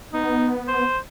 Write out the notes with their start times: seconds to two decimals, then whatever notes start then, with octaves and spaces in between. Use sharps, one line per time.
0.13 B3 D#4
0.68 C5